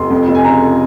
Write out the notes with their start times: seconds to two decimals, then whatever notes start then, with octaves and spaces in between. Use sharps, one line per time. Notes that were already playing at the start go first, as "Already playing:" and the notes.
Already playing: F1 C6
0.10 F2
0.28 F1
0.35 G#5
0.44 C#3 A#5